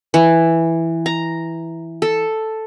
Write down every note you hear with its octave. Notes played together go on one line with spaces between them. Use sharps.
E3
A#5
A4